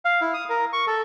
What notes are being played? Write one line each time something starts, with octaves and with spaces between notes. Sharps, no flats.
F5
E4
D#6
A#4
C#6
A4